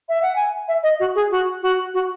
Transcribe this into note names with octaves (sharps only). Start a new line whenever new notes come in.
E5
F#5
G#5
E5
D#5
F#4
G#4
F#4
F#4
F#4